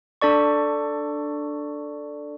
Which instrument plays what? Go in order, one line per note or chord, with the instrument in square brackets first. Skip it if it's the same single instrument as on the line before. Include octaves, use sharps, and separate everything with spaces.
[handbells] D4 A4 D5 C#6